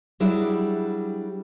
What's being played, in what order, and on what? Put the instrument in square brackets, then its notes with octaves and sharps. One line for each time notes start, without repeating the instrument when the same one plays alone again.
[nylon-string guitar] F#3 G3 D4 E4 G#4